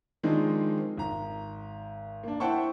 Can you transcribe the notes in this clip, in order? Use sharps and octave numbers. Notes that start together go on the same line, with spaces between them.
D#3 F3 G#3 C4 D4 D#4
G#1 A#5
A#3 D4
E4 C5 F#5 G5 A5 C#6